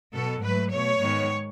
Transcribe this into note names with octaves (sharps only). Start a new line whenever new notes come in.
B2 F#3 B3 A4
G#2 F#3 A3 B4
B2 A3 C#5
G#2 D#3 G#3 B3